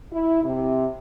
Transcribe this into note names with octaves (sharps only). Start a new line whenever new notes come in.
E4
C3